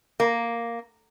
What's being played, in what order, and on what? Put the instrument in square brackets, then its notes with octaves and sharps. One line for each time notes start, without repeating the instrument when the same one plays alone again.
[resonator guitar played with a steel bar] A#3